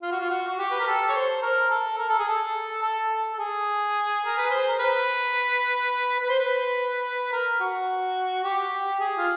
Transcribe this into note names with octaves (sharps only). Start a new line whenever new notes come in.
F4
F#4
F4
F#4
F#4
G4
B4
A#4
A4
C#5
C5
A#4
A4
A#4
A4
G#4
A4
A4
A4
G#4
A#4
B4
C5
A#4
B4
B4
C5
B4
A#4
F#4
G4
G#4
F4